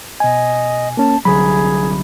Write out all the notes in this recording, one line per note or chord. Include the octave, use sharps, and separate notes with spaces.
B2 D#5 G#5
A#3 C#4 A5
C2 D3 F#3 G#4 B5